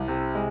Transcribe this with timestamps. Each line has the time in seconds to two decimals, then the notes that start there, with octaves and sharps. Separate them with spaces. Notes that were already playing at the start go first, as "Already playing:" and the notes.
Already playing: C2
0.08 C3
0.35 G#3